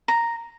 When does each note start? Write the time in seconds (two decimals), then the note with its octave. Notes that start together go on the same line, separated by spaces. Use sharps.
0.08 A#5